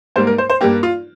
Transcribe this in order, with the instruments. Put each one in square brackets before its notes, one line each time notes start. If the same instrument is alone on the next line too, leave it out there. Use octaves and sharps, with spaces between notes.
[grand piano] G#2 G3 A#3 C5
A#4
C5
C5
G2 G3 A#3 G4
F4